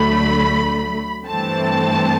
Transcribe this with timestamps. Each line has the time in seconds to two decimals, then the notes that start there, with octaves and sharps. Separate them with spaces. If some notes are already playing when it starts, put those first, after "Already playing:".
Already playing: D2 D3 F#3 A3 B5
1.26 G2 E3 A3 C4 A5